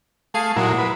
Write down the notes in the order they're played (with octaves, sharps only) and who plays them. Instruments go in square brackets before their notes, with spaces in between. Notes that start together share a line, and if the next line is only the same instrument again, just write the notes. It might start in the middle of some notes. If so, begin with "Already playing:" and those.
[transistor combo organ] A3 [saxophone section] G#4 F5
[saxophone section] D#2 G#3 E4 [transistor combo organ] A#2 F#3
[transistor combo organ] B4